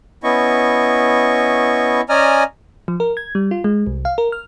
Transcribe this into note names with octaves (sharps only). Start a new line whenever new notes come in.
B3 C#4 E4 D#5 C#6
C#4 D5 D#5 G#5 A#5 F6
F3
A#4
G#6
G3
F4
G#3
C2
F5
A#4
F6